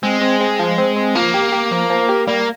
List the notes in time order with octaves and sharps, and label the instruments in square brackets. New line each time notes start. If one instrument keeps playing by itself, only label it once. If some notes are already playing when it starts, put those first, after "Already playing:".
[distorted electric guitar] G#3 [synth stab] C4
[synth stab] C4
C4
F3
C4
C4
[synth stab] F3 [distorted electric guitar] A#3
[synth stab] G4
G4
F3
F3
G4
[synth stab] G3 [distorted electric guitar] A#3